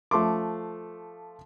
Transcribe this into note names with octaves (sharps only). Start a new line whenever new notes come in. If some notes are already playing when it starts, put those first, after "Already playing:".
F3 A3 C6 D6